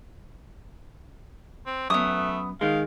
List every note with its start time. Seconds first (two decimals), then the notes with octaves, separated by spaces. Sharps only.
1.66 C4
1.90 F#2 A3 B3 D#6
2.61 D#3 G#3 F5